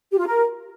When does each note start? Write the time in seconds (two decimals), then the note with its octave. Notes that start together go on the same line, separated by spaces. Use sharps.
0.12 G4
0.19 F4
0.27 A#4